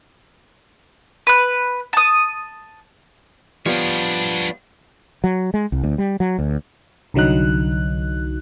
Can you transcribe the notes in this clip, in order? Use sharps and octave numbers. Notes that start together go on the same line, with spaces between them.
B4 F#6
A5 D#6
F3 G3 B3 D4 C#5
F#3
G#3
C2
D2
G3
F#3
D2
C2 D3 F#3 D#4 F#6